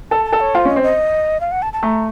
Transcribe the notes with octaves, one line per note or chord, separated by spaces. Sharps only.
A4 A5
A5
A4
C#5
F4 C5
C#4 D#5
C4
D#5
F5
F#5
A5
A5
A3 A#5